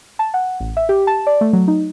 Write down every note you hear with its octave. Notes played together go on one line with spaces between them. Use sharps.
A5
F#5
A1
E5
G4
A5
D5
A3
F#3
D#4